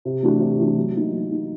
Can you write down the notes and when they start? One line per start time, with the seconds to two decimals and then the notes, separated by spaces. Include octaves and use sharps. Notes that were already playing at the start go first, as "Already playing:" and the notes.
0.05 C3
0.23 E3 A3 D4 F#4
0.40 C3
0.59 E3 A3 D4 F#4
0.76 F#3
0.94 A#3 D#4
1.12 F#3
1.31 A#3 D#4